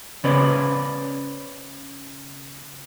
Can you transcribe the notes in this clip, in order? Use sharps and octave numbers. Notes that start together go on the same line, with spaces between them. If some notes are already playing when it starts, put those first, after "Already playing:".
C#3 C#4 B4 C5 D5